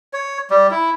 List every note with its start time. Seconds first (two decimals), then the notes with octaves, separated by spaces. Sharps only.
0.13 C#5
0.50 G3
0.71 E4